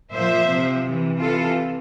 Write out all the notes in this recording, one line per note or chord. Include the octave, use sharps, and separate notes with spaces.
A#2 F3 C5 E5
C3 F3
C3 E3
C3 E3 F4 A4